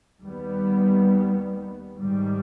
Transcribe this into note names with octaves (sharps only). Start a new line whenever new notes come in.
D#2 D#3 G3 B3
G#2 D#3 G3